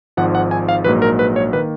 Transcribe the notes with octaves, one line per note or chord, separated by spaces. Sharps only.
G#1 G#2 F3 F#5
F#5
G#5
F5
A#1 G#2 F#3 A#3 B4
A#4
B4
C#5
D#3 A#3 B4